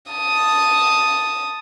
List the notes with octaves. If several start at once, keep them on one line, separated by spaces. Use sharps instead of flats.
A5 D#6